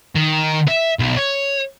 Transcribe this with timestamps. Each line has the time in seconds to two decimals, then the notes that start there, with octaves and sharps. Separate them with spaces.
0.15 D#3
0.68 E5
0.99 B1
1.17 C#5